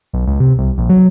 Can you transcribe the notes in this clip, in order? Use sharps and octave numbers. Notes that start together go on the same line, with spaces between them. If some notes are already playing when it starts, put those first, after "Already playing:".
B1
C#2
C3
C2
A#1
F#3